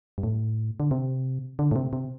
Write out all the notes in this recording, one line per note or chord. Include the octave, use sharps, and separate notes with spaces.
G2
A2
D3
C3
D3
A2
C3
C3